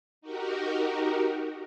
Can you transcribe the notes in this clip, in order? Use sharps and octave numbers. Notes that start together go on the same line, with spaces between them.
D#4 F#4 G4 A#4